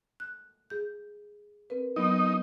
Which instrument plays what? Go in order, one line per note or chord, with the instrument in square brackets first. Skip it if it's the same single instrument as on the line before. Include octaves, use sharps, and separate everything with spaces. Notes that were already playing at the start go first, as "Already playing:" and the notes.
[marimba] F#6
G#4 G6
C4 A#4 B4
[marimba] F#3 B3 [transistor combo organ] D#4